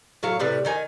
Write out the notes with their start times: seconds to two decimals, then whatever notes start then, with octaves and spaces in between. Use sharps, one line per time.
0.23 A2 F#3 C#5 F5
0.39 A2 C3 G3 B4
0.65 D#3 D#4 G#5